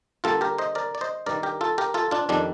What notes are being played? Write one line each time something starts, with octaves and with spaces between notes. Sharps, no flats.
D3 G3 A#3 F4 A4
G4 A#4
C5 D#5
A#4 D5
D5
C5 D#5
G2 D#3 G3 A#4 D5
G4 A#4
F4 A4
G4 A#4
F4 A4
D4 F4
F2 D#3 G3 D4